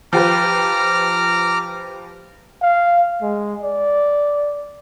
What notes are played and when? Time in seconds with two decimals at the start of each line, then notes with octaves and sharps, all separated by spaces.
0.13 F3 G4 B4 A#5 D6 F6
2.62 F5
3.22 G#3
3.63 D5